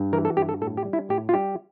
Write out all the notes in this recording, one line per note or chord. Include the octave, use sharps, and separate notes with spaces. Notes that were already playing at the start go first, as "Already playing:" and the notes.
Already playing: G2
E3 A#4
A4
G2 G4
A4
A2 A4
G4
G3
E4
A2 G4
F4
G3 G4